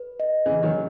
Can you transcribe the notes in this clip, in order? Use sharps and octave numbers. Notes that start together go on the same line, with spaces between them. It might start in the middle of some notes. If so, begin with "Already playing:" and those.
Already playing: B4
D#5
C#3 E3 G#4
D#3 F#3
C#4